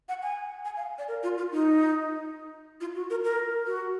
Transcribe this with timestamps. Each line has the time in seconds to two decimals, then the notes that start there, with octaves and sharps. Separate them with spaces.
0.09 F#5
0.23 G#5
0.65 G#5
0.77 F5
0.98 D5
1.08 A#4
1.23 F4
1.38 F4
1.52 D#4
2.81 F4
2.95 F#4
3.10 A#4
3.24 A#4
3.67 F#4